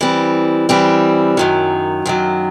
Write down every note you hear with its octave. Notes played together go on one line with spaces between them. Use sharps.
E3 G3 C4
E3 G3 C4
F#2 D#3 F#3
F#2 D#3 F#3